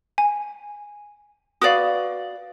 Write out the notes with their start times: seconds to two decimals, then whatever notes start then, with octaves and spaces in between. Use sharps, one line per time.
0.18 G#5
1.62 F#4 B4 D5 F5 D#6